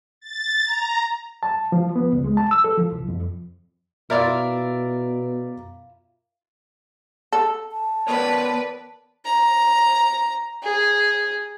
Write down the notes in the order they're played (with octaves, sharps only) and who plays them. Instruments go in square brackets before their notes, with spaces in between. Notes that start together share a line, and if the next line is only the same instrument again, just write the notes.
[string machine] A6
A#5
[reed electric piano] A5
F3
B3
C#2
G#3
A5
E6
A4
F3
C2
F2
[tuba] B2 [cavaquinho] E4 F4 [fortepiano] A#4 D5 E5
[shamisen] A4
[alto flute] A5
[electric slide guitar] B3 A#4 C#5 [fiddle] B4 D5
[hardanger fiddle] A#5
G#4